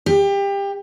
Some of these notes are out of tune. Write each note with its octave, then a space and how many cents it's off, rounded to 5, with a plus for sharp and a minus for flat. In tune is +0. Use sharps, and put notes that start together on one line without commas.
G4 +25